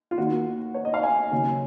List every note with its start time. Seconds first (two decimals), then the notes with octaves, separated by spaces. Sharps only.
0.11 F4
0.18 D#2 D#3 A#3 F#4
0.74 C#5
0.85 D#5
0.94 F5
1.03 G#5
1.31 D#2 C#3 F#3